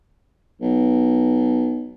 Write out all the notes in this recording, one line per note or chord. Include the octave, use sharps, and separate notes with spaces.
B1